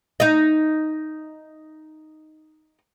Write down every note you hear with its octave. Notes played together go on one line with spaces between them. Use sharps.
D#4 D#5